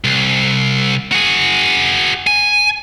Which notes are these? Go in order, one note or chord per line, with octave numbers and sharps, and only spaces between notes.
C2
F#4 G#4
G#5